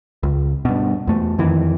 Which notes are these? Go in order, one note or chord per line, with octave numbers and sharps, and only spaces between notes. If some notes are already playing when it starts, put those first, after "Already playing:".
C#2
G2 B2
E2 A3
F2 D#3 E3